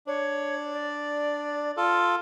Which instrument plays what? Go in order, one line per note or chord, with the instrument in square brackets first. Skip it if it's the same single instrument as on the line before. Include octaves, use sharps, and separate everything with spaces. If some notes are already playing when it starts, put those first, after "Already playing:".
[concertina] D4 [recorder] C#5
[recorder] D5
[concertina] F4 A4